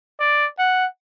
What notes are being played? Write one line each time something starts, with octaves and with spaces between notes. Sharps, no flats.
D5
F#5